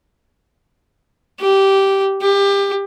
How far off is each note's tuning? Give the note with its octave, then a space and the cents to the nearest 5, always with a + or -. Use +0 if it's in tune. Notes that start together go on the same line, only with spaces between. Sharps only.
G4 -10
G4 +25